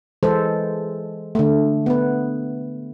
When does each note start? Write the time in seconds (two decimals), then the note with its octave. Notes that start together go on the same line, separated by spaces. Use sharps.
0.23 E3 G#3 A4 C5
1.35 D3 A3
1.86 B3 B4